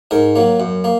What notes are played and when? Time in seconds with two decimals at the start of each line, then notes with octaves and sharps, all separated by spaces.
0.11 G#2 A#4
0.36 F#3 A#3
0.60 F#2
0.84 A#3